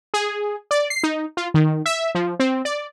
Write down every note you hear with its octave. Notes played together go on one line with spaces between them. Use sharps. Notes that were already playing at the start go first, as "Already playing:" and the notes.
G#4
D5
C7
D#4
F4
D#3
E5
F3
C4
D5